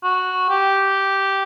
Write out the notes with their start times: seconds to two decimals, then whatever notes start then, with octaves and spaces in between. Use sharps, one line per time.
0.04 F#4
0.50 G4